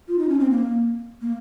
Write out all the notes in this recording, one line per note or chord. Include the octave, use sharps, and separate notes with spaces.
F4
D#4
C#4
C4
A#3
A#3